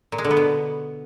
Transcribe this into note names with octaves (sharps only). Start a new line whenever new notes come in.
A#2
G#3
D3
B3
B2